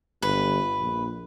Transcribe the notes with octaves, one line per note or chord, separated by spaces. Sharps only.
G1 B4
A#1